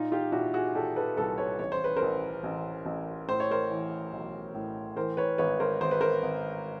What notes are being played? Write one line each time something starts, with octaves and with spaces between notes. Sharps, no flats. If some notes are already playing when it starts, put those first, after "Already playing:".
Already playing: A#2 D#4 F4
F4 G4
A#2 E4 F#4
F#4 G#4
A#2 G4 A4
A4 B4
C2 A4 B4
B4 C#5
A1 C#5
C5
B4
A#4 C5
A1
A1
A1
A2 C5
C#5
A#4 C5
E3
B1
A2
E3 A#4 C5
B4 C#5
G#1 B4 C#5
A#4 C5
G#1 C5
B4
A#4 C5
G#1